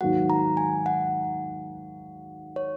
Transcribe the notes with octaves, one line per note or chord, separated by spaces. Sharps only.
G#2 D#3 F#3 A#3 F#4 F#5
A#5
G#5
F#5
C#5